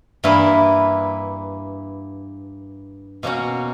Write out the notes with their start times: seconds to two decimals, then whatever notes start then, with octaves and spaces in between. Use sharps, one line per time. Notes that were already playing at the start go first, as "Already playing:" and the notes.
0.24 G2 E3 A#3 E4 B4
3.23 B2 A#3 C#4 F#4